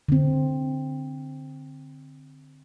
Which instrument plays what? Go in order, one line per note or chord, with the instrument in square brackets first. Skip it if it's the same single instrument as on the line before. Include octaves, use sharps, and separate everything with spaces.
[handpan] D3 C4